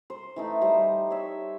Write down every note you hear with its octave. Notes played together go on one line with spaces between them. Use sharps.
C5
E3 A3 D#4
G3 C5 D#5 A#5
C#5 E5